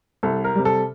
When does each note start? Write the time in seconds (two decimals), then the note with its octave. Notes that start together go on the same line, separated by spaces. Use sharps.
0.23 C2 A4
0.44 A#4
0.55 C3 G3
0.65 A4